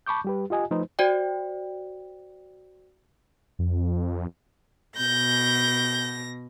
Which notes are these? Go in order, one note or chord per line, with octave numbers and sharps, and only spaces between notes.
A5 B5 C#6 D6 G6
G3 G4 B4
F4 G4 D#5 G#5
F3 A3 D#4 B4 C5
F#4 C5 D5 G5
F2
B2 G6 A#6